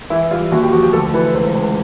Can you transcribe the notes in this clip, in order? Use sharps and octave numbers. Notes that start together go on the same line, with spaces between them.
E3 E4
G3 F4
D#2 F#4
G4
F3 F#4
G4
D2 A4
E3 B4
C#2 C5
C#2